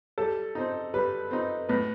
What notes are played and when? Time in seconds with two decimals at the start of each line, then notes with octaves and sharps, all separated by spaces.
0.18 G3 A4
0.55 C4 D#4
0.94 G3 B4
1.31 C4 D#4
1.69 A2 B4